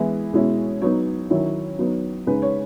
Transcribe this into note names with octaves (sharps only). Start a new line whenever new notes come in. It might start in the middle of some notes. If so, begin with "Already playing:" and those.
Already playing: E3 G#3 B3 E4
B2 G#3 C#4 E4
F#3 B3 D#4 C#5
D#3 F#3 C#4 E4
F#3 B3 D#4
C#3 G#3 D#4 B4
C#5